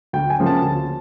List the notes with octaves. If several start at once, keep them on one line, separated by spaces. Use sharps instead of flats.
D2 G5
G#5
C#3 F3 A#3 C#4
A5
D2